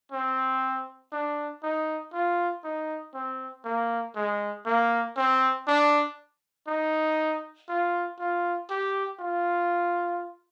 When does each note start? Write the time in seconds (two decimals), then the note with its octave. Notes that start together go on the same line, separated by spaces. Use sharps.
0.12 C4
1.12 D4
1.63 D#4
2.13 F4
2.64 D#4
3.14 C4
3.65 A#3
4.16 G#3
4.66 A#3
5.16 C4
5.67 D4
6.67 D#4
7.69 F4
8.19 F4
8.70 G4
9.20 F4